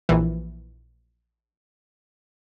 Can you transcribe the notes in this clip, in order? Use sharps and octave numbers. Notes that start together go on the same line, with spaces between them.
A#1 E3